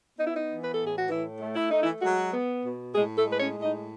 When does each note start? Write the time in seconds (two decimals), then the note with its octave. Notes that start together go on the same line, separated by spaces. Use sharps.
0.18 B3 D#4
0.27 E4
0.35 D#4
0.48 E3
0.63 B4
0.74 A2 A4
0.86 G#4
0.97 F#4
1.09 E3 A3 E4
1.41 A3
1.56 E4
1.69 A3 D#4
1.82 E3 E4
2.01 F#3 G#3 F#4
2.32 B3
2.63 B2
2.93 A2 G#3 G#4
3.16 A3 A4
3.24 G#3
3.31 B4
3.39 C#4 C#5
3.55 A2
3.62 D#4 D#5